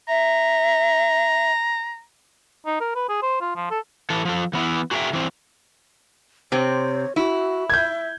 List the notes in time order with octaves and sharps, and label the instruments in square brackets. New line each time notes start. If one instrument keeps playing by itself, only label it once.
[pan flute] E5 [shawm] A#5
[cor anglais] D#4
A#4
B4
G#4
C5
F4
F3
A4
[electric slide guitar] E3 A4
F3 A4
E3 B3 E4
F#4 G#4 A#4 B4 E5 G5
E3 C4
[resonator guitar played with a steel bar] C3 C4 [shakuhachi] C#5
[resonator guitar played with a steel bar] E4 [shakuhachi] F#4
[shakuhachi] E5 [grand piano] G6 G#6